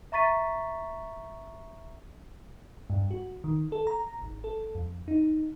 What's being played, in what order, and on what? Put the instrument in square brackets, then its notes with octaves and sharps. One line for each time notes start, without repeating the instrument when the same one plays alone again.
[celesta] E5 A#5 C#6 A6 B6 D#7
[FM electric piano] G2
F#4
D#3
A4
A#5
G#1
A4
F2
D#4